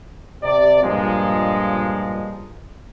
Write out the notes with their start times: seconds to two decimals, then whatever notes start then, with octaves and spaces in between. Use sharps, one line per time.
0.43 C3 D5
0.82 G2 A#2 F3 G#3